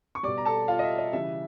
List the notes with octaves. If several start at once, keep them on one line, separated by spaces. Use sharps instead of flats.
C#6
B2 G3 D5 D6
A#5
A4 A5
F4 F5
D#5
E5
D#5
C#3 E3 G3 E5